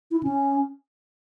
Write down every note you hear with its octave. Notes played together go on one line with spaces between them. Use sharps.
E4
C#4